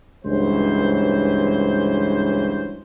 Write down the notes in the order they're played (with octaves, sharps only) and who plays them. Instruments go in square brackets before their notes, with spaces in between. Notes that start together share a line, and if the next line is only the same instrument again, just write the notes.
[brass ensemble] C#2 G2 E3 F#3 C5